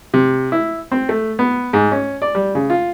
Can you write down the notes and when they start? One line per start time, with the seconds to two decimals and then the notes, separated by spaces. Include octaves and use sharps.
0.14 C3
0.52 E4
0.91 C4
1.09 A3
1.39 B3
1.73 G#2
1.92 C#4
2.22 D5
2.35 G3
2.55 C#3
2.70 F4